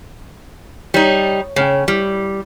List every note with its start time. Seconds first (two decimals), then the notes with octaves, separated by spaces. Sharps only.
0.94 G3 D#4 C#5
1.56 C#3 C#4 G5
1.88 G3 E4